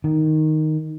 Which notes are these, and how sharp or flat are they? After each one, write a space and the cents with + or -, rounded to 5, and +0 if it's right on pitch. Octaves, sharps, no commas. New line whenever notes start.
D#3 +0